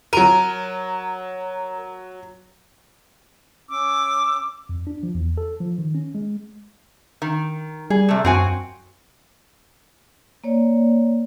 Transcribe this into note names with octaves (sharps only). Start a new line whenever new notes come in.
F#3 A#4 D#7
C#4 D6 E6
F2
D4
F3
E2
A4
F3
D#3
C#4
G#3
D#3
G3 G#4
C3 A3
F#2 C4 F#4 G#5
A#3 C#5 D5